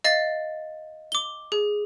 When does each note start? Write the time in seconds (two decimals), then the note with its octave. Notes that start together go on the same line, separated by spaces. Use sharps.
0.04 D#5 F5 A6
1.12 D6 G7
1.52 G#4